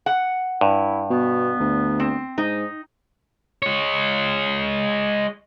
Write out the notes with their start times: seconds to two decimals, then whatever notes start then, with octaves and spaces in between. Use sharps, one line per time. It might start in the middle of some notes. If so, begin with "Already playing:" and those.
0.06 F#5
0.61 G2 E4
1.10 B2 B3
1.60 D2
2.00 C4
2.38 G#2 D#4
3.63 G#3 C#5